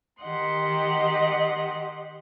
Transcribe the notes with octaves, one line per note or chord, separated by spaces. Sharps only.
D#3 G4 D#5 F#5 C6